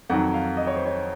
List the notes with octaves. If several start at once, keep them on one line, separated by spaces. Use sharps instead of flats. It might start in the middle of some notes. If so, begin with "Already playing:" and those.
F2 D#3 F#3 F#5
F5
D#5
C#5
C5
C#5